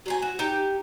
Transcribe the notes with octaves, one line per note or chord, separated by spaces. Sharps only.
F#3 C5 G#5
F#4
D#4 G4